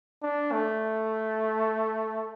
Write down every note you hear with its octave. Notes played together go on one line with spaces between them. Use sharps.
D4
A3